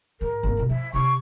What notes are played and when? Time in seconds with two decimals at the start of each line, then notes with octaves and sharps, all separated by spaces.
0.21 G#2 A#4
0.43 G#1 A#3
0.57 G2 B2
0.69 F3 E5
0.93 C3 F4 C#6